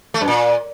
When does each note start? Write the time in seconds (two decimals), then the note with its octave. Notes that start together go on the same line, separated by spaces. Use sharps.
0.14 A3
0.21 F#2
0.28 A#2